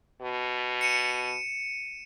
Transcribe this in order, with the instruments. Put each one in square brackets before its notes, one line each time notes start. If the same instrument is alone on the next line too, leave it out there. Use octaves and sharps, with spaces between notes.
[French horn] B2
[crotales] C#7 D#7 E7